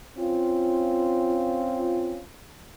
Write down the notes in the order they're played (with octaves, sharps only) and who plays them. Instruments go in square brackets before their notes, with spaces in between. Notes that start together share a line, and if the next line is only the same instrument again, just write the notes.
[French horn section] C4 C#4 F4